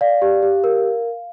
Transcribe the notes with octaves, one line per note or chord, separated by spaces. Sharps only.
D5 F5
G4
G4
A#4